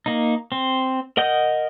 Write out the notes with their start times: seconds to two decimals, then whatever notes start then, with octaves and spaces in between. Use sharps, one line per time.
0.06 A#3 D#4
0.52 C4
1.17 A#4 D#5 F#5 D#6 G6